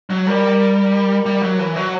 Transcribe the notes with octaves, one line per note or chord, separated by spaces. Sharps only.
F#3
G3 A#4
A#4
G3
F#3
E3
F#3